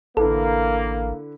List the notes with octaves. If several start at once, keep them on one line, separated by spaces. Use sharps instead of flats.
A1 D3 A#3 E4 A4 B4